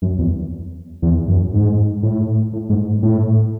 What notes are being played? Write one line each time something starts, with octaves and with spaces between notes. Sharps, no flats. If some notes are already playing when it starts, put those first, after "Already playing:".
F#2
E2
E2
F#2
G#2
A2
A2
G#2
A2